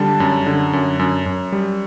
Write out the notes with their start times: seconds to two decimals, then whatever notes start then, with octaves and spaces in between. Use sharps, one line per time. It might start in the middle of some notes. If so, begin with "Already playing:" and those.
Already playing: D3 G3 A5
0.20 F#2
0.46 D3
0.73 F#2
0.99 F#2
1.26 F#2
1.52 G3